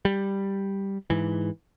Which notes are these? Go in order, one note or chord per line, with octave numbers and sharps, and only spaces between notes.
G3
G#2 E3